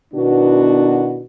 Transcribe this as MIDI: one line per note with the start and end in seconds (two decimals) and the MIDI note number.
0.14 1.24 47
0.14 1.24 51
0.14 1.24 59
0.14 1.24 62
0.14 1.24 64
0.14 1.24 66